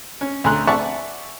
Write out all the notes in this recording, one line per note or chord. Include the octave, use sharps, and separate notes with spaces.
C#4
D2 D3 G#5 A#5 C6 F#6
D5 E5 F#5 G#5 A5 C#6